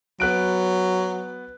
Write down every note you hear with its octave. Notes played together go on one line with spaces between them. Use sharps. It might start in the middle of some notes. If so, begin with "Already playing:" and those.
F#3 B3 F#6 D7